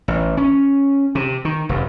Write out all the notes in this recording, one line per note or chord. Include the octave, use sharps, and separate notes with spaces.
A1
C#4
C3
D#3
F1 F#2